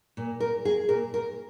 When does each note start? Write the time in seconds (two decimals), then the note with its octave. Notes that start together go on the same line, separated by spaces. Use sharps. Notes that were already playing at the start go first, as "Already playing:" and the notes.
0.17 A#2
0.40 A#4
0.65 G#4
0.89 A#2 A#4
1.14 A#4